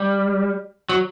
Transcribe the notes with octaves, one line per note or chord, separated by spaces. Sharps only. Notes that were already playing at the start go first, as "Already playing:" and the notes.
Already playing: G3
F#3